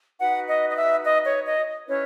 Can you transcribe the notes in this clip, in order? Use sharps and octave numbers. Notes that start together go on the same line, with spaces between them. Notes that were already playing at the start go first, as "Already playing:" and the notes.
D#4 F#4 B4 F#5
D#5
D#5
E5
D#5
C#5
D#5
C#4 E4 B4 C#5